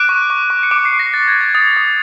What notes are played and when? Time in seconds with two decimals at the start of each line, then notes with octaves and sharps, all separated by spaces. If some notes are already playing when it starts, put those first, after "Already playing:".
Already playing: D6 F#6 D7
0.09 C#6
0.30 C#6
0.50 C#6
0.63 C#7
0.71 D6 D7
0.85 C7
0.92 D6
0.99 A#6
1.14 F#6 A6
1.28 G#6
1.35 F#6
1.41 G#6
1.55 D#6 A6
1.77 D#6